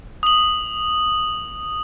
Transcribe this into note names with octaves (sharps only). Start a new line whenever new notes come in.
D#6 F#7